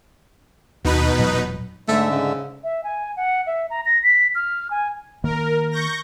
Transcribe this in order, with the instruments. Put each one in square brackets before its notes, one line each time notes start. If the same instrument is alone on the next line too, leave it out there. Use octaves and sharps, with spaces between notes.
[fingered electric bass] D#2 [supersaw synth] B2 D#4 B4
[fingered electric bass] E1 A#2 F#3
[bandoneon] G#2 D3 E5 [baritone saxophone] A3
[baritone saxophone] C#3
[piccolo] E5
G#5
F#5
E5
A#5
A#6
B6
F6
G#5
[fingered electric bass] D#3 A#3 [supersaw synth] A#4
[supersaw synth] C#6 G6 A#6